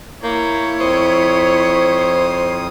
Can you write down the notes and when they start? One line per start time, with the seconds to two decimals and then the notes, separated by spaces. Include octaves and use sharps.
0.23 A#3 E4 C#5 G6
0.80 F2 C5 D#6